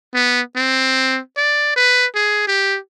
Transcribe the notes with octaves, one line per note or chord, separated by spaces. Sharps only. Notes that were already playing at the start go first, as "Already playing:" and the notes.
B3
C4
D5
B4
G#4
G4